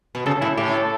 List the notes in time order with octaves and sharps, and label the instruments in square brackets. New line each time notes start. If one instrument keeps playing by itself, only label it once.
[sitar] B2
[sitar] C#3 [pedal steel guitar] A4
[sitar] A2 [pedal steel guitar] E4
[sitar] A2 [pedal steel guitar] G4
[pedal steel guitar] A4